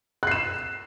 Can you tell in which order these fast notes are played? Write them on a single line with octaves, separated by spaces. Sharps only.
F#6 C7 E7